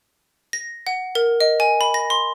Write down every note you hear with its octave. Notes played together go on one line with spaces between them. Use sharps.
A#6
F#5
A#4
D#5
G#5
B5
A#6
C6